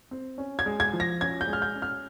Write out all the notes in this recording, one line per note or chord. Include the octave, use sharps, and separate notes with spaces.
C4
C#4
G#6
G#3
G#6
F3
A#6
C#4 G#6
G6
G#3
F6
G6
C#4
F6